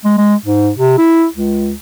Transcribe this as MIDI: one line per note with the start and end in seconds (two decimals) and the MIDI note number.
0.05 0.14 56
0.18 0.35 56
0.45 0.70 44
0.77 0.96 48
0.98 1.26 64
1.33 1.76 37